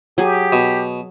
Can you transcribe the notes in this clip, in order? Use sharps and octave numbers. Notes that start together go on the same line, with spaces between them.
F#3 G4 G#4
B2